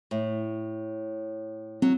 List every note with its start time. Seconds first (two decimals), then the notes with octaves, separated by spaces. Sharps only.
0.11 A2
1.82 F#3 C4